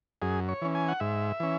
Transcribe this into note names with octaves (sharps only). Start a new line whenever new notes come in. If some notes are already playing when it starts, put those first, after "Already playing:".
F#2 G#4
C#5
E3 C#4
G#5
F#5
G#2 E5
E3 C#4